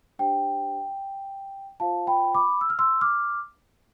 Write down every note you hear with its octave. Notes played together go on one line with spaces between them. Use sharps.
D4 G4 C5 G5
F4 C5 F5 A5
G5 B5
B5 D6
E6
F6
C6 E6
D6 F6